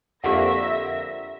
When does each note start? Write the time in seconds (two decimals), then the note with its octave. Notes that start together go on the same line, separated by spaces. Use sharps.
0.24 F2 D3 A#3 G4 E5 F#5 A#6